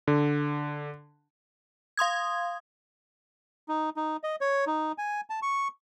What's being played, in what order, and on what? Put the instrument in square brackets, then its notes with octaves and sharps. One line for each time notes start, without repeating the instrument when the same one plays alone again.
[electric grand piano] D3
[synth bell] F5 C6 D#6 G#6
[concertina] D#4
D#4
D#5
C#5
D#4
G#5
A5
C#6